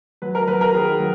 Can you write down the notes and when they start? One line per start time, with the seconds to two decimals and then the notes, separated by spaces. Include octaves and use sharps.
0.22 F#3 B4
0.35 A#4
0.48 F#3 B4
0.61 A#4
0.74 D#3 G#4
1.00 F#3